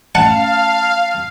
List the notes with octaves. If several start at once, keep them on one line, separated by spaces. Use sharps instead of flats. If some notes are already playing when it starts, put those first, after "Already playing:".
A3 C#4 F5 F#5 A5